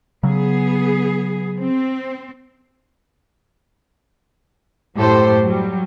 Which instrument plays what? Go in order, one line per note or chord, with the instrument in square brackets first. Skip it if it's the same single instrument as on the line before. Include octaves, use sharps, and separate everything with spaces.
[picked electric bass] C#3 F#3 [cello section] B3 G#4
[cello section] C4
[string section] F#2 A2 G4 A4 C5
F#3 G3